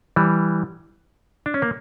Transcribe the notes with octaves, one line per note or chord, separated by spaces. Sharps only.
E3 G3
D4
C#4
A#3